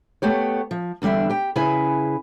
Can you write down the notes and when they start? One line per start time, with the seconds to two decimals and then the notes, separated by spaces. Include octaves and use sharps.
0.22 A3 B3 G4 C#5
0.71 F3
1.02 E2 D3 G3 D4 E5
1.30 G4 G5
1.56 C#3 E4 G#4 B4 G#5